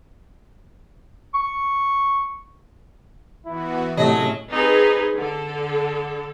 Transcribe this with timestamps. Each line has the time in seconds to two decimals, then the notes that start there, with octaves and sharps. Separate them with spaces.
1.34 C#6
3.46 E3 B3 E4 F#4
3.97 A2 C3 F#3 G#3 A3 C#4 D#5
4.51 C4 D#4 G#4 B4
5.15 D3 A4